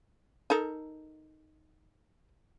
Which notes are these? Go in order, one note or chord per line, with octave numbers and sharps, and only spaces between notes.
D#4 A4 A#4